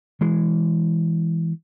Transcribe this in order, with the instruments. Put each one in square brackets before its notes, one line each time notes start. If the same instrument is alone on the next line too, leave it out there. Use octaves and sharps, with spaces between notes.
[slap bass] E3 G#3